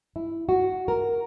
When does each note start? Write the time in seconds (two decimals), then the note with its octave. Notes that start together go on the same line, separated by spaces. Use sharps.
0.16 E4
0.49 F#4
0.88 A#4